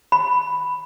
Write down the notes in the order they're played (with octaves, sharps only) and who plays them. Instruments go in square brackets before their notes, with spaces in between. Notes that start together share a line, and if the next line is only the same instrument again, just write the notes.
[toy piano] B5